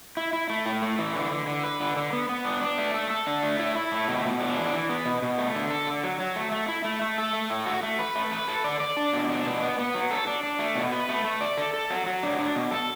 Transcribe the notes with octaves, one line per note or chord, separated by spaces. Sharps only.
E4
E4
A3
A2
A3
E3
D3
D3
D3
B4
D3
D3
B3
B3
D4
D4
A3
A4
A4
D4
A3
E4
E4
A3
B2
B2
D4
E3
E3
B3
B2
B2
A3
D3
A4
D3
F#3
F#3
A3
A3
E4
A3
A3
A4
A3
A2
F#4
A3
B4
A3
B4
A4
D5
D5
D4
B2
D4
B2
B3
B3
F#3
A4
D4
D4
A3
B2
B4
A3
A3
D5
A4
A4
F#3
F#3
D4
D4
B2
A4